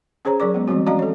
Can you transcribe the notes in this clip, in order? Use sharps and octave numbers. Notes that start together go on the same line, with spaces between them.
C#4 G#4 C5 C#5 A#5
F#3 G#4 A#4 D5 D6
G#3 B3
E3 F3 G3 G#3 C4 F#4
C#4 F#4 D5 D#5 F5 A#5
A4 C#5